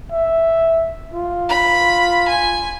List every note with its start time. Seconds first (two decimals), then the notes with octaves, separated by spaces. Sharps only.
0.12 E5
1.14 F4
1.49 B5
2.28 G#5